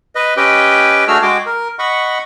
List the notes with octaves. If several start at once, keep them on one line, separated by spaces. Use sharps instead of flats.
B4 D#5
C#4 G4 B4 D#5 G5
A3 D4 F#4 G#4 E6 F6
G#3 F#4 G#4 G5 D6
A#4
D#5 F#5 B5 C#6